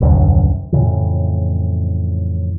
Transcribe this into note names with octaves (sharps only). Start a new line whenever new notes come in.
D#1 C2 F#2 D3
F2 A2 C#3 E3